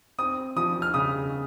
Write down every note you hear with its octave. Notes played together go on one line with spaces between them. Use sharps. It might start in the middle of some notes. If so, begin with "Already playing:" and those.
C4 D#6
F3 D#6
F6
C#3 D#6